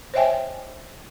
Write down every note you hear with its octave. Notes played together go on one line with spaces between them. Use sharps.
C5 C#5 D#5 E5 G5 G#5